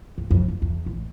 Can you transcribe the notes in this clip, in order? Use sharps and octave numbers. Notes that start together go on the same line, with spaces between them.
D#2
F2
D#2
E2
A1